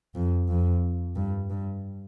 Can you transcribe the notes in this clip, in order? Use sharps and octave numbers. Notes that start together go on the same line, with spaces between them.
F2
F2
G2
G2